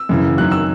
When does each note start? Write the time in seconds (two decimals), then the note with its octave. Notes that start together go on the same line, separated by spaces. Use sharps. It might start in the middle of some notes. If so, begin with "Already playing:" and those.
Already playing: E6
0.09 F#2 C#3 E3
0.38 F#2 D#3 F#3 F#6
0.52 E6